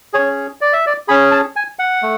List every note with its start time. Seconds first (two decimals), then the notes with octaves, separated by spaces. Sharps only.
0.13 C#4 G#4 C#5
0.61 D5
0.73 E5
0.86 D5
1.08 C#4 G#4 B5
1.31 A5
1.56 G#5
1.79 F#5
2.02 A3